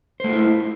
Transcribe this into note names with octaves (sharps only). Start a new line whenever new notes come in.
A3 E4 F4 C5